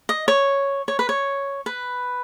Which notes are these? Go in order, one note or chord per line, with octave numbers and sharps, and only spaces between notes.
D#5
C#5
C#5
B4
C#5
B4